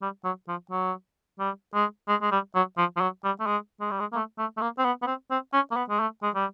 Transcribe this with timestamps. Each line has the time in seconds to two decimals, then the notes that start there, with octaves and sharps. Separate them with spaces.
0.02 G3
0.24 F#3
0.48 F3
0.71 F#3
1.40 G3
1.74 G#3
2.08 G#3
2.22 G#3
2.32 G3
2.55 F#3
2.78 F3
2.97 F3
3.01 F#3
3.24 G3
3.40 A3
3.47 G#3
3.81 G#3
3.91 G3
4.00 G#3
4.12 A#3
4.16 A3
4.39 A3
4.57 A3
4.61 A#3
4.78 C4
4.85 B3
5.02 B3
5.07 C4
5.31 C4
5.53 C#4
5.71 A#3
5.76 B3
5.90 G#3
6.00 A3
6.23 G#3
6.35 G3